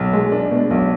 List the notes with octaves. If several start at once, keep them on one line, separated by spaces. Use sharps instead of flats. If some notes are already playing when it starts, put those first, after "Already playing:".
Already playing: B1
G#3
D4
B2
B1